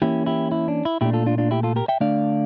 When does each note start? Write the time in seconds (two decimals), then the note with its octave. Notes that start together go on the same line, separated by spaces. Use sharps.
0.02 E3 A#3 C#4 E4 G4
0.26 E4 G4
0.52 E4
0.68 D4
0.85 E4
1.01 A#2 A3 D4 E4 G4
1.13 F4 A4
1.26 D4 F4
1.38 D4 F4
1.51 E4 G4
1.63 F4 A4
1.76 G4 A#4
1.88 E5 G5
2.00 D3 A3 D4 D5 F5